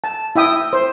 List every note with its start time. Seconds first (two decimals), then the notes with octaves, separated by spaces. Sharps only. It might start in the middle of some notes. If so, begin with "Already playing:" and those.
0.04 A5
0.36 E4 E5 G5 D#6
0.73 C5